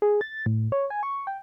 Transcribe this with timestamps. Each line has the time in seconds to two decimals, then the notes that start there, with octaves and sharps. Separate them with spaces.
0.02 G#4
0.21 A6
0.46 A2
0.72 C#5
0.90 G#5
1.03 C#6
1.27 G5